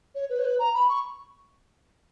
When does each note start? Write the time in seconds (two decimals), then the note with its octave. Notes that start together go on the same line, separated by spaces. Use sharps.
0.15 C#5
0.30 B4
0.39 C#5
0.45 B4
0.59 A#5
0.74 B5
0.89 C#6